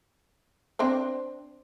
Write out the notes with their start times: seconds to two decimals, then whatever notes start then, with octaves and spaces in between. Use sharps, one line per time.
0.79 C4 D4 C5